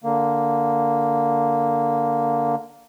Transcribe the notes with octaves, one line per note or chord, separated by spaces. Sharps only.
D3 A#3